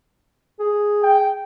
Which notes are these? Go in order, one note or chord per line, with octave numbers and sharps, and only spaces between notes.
G#4
G5